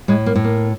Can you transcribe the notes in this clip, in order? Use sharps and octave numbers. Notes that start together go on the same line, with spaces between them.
A2 G#3
A#3
A2
A#3